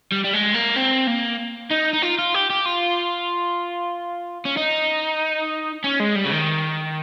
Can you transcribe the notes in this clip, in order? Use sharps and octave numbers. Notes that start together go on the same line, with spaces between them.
G3
G3
G#3
A#3
C4
A#3
D#4
D#4
F4
F4
G4
G4
F4
C#4
D#4
C#4
G#3
G3
C#3
D#3